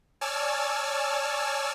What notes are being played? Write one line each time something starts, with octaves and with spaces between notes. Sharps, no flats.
C#5 D5 G#5 A5 E6 F6